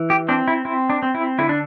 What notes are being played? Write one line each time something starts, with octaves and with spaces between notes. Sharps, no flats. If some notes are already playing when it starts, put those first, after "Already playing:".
Already playing: E3
G4
C4 D4
E4
C4 E4
D4
C4
E4
D3 E4
D4